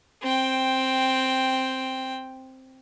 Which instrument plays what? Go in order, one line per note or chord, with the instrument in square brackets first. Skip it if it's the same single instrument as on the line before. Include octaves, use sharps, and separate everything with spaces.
[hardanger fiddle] C4 G5